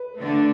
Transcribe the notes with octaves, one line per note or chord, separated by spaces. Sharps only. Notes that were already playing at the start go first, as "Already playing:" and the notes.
Already playing: B4
D3 A3 D4